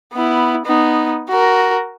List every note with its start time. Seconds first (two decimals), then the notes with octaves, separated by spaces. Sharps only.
0.13 B3 E4
0.66 B3 D#4
1.29 F#4 A#4